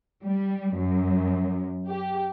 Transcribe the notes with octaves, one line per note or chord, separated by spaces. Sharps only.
G3
F#2
G4